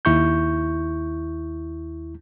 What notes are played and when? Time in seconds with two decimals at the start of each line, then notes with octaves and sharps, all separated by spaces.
0.05 D#2 E4 C#6 G6